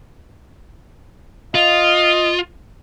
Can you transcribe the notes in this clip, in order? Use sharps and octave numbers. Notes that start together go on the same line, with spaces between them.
F4 D#5